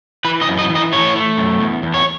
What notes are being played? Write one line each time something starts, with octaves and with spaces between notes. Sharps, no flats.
E3 B4
D#5
F#2
D#5
E3
D#5
A3 C#5
A3
F#2
E2
E2
C#5